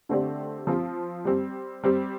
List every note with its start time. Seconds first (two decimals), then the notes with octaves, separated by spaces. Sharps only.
0.09 D3 A3 C4 G4 D5
0.67 F3 C4 F4
1.25 G3 C4 G4
1.84 G3 C4 G4